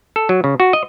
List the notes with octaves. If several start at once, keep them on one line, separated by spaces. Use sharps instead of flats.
A4
F#3
C#3
F#4
D#5